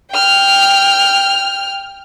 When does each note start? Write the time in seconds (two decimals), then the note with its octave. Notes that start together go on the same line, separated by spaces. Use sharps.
0.11 G5 F6